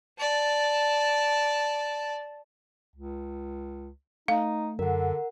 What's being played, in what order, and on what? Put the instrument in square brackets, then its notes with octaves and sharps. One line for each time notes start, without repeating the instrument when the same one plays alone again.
[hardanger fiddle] D5 A5
[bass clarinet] C#2
[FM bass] A3 [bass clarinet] D#4 [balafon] F5
[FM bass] F#2 [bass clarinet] D3 [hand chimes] A#4 F#5